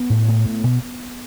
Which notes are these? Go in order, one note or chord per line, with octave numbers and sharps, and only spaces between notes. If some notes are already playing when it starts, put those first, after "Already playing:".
Already playing: B3
A2
A2
A2
B2